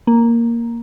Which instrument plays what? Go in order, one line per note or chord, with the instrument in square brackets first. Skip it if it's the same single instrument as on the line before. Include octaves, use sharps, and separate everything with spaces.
[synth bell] A#3